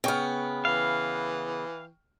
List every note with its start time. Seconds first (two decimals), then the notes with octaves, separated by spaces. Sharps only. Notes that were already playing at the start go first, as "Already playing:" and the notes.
0.04 C#3 B3 G5 C#6 F6
0.65 E3 F5